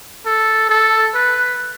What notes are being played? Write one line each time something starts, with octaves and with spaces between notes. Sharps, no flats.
A4
A4
B4